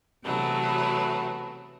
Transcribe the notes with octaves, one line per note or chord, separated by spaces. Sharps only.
C3 E3 F#3 A3 B3